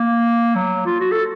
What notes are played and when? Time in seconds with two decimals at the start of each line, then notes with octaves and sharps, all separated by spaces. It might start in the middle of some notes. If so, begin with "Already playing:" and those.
Already playing: A#3
0.56 F#3
0.86 F4
1.00 F#4
1.12 A4